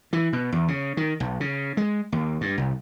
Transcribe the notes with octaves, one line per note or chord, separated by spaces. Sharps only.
E3
B2
E2
C#3
D#3
B1
C#3
G#3
D#2
G2
C2